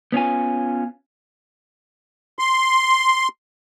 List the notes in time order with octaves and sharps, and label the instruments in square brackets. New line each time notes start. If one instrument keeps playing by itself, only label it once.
[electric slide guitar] B3 C#4 F4 G#5
[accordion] C6